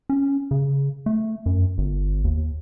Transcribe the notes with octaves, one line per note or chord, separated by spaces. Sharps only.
C#4
C#3
A3
F#2
G1
D#2